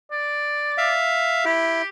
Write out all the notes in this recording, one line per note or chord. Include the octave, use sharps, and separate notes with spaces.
D5
E5 F5
E4 G4